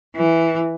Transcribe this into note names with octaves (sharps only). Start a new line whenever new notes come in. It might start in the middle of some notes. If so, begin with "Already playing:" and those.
E3